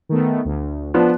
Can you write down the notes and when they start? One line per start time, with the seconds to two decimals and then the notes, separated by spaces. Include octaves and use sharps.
0.09 D#3 A3 B3
0.45 D2
0.94 F3 B3 D4